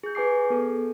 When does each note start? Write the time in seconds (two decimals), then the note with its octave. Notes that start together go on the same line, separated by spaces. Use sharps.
0.03 G#4 G6
0.15 G#4 B4 G#5 D6 C7
0.50 B3 A4